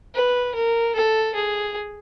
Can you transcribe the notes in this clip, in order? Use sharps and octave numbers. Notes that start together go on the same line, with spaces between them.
B4
A#4
A4
G#4